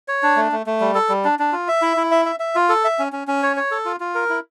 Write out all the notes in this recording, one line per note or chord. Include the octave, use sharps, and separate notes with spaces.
C#5
D4
A3
A3
A3
G3
A4
G3
D4
D4
F4
E5
E4
E4
E5
E5
E5
F4
A4
E5
C#4
C#4
C#4
C#5
C#5
A4
F4
F4
A#4
E4